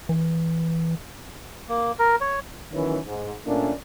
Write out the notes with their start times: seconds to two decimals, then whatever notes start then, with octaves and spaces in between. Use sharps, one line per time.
0.09 E3
1.69 A#3
1.99 A#4
2.21 C#5
2.72 D#3 E3 F#3 B3 C#4
3.05 G#2
3.45 A#2 A3 A#3 C#4 D4